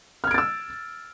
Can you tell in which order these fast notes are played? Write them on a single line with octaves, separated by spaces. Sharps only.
F6 G#6 D7 A6 E6